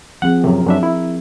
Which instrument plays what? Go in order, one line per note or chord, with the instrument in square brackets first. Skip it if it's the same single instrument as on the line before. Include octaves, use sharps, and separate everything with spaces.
[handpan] F3 C4 G#4 [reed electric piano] F#5
[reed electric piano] F#2 C3 [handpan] A#4
[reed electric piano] F#2 D4 E5
E4